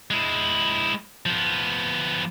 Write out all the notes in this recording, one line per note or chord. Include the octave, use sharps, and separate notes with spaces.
G#3 E4
F3 B3